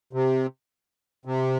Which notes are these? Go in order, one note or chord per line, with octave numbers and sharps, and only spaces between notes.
C3
C3